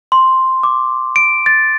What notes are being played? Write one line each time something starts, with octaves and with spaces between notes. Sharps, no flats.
C6
D6
D7
A6